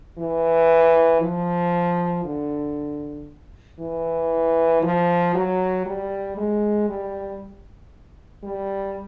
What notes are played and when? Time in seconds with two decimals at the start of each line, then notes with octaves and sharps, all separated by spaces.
0.18 E3
1.21 F3
2.25 D3
3.79 E3
4.83 F3
5.34 F#3
5.86 G3
6.37 G#3
6.89 G3
8.43 G3